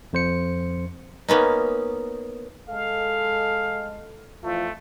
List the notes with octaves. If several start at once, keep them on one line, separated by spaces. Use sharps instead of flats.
F2 C5 C#7
A#3 B3 C#4 D#4
G#3 A4 F5
F2 E3 A3 F4